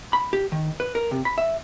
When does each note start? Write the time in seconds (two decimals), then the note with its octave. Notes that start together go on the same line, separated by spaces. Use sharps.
0.13 B5
0.33 G4
0.52 D#3
0.80 B4
0.95 A#4
1.11 C3
1.25 B5
1.38 E5